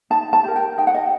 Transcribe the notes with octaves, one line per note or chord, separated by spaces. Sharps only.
D#4 A5
A5
G4 A#4
G5
D#4 G5
F#5
D#5